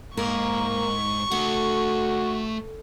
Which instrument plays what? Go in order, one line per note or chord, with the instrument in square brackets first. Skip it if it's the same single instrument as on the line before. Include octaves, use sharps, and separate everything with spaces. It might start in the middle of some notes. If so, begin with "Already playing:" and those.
[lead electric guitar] G#2 [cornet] A#3 [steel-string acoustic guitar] A#4 [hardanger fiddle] C#6
[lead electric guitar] A3 F#5 [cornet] F#4 [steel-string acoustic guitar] A4